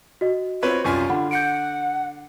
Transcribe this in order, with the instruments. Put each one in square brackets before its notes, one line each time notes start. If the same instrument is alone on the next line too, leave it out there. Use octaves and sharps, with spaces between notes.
[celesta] F#4 D#5
[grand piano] C4 B4 C#5 [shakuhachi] F4
[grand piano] C2 F#2 G#5 [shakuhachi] F4 [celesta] C#6
[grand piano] D3 [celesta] F#5 B5
[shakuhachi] F#5 [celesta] G6 C#7 D7